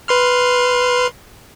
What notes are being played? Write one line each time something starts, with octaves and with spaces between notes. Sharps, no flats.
B4 C6 F6